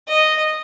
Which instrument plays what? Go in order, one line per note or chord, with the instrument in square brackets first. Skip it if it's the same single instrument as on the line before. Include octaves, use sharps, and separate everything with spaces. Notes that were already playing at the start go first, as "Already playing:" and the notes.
[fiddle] D#5